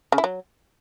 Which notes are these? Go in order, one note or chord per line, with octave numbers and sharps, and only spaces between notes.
C#3
E4
F#3